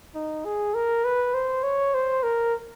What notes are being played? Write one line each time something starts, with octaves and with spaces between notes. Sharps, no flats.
D#4
G#4
A#4
B4
C5
C#5
C5
A#4